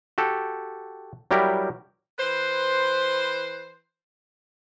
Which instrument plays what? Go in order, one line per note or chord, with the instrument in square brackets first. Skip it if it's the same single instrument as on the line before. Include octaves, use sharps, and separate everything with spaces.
[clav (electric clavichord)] F#4 G4 A4
F#3 G3 E4 G4 A#4
[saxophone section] E3 B4 C5